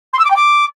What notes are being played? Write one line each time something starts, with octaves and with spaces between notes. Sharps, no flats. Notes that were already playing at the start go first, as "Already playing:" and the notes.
C6
E6
D6
G5
D6